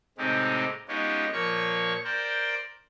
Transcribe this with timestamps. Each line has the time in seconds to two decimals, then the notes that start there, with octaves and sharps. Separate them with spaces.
0.18 A2 C3 G#3 C4 D#4 G4
0.88 G#3 B3 C#4 D#4 F4 G4
1.33 A#2 F3 A#3 C#5 C#6
2.05 A#4 C5 D5 G5